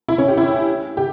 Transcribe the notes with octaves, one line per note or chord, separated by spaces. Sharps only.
E4
C#4
G4
E4
G4